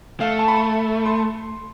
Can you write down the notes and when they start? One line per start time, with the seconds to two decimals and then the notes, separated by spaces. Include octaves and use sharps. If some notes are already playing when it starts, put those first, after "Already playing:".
0.20 A3 F5
0.39 A5
0.48 B5
1.06 C6